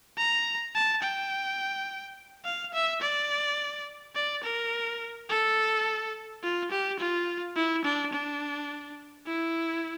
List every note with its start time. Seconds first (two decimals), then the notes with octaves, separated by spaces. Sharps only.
0.18 A#5
0.75 A5
1.03 G5
2.45 F5
2.74 E5
3.02 D5
4.15 D5
4.44 A#4
5.29 A4
6.43 F4
6.71 G4
6.99 F4
7.56 E4
7.85 D4
8.13 D4
9.26 E4